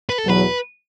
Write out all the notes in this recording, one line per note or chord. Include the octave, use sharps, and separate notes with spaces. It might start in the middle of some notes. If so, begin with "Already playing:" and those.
B4
A4
E2 B2 F#3 B4